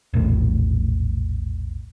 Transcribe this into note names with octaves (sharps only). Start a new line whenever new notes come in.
E1 A#1 A2